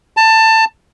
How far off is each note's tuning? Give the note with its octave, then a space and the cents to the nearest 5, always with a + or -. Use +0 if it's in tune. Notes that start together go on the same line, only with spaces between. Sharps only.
A5 +20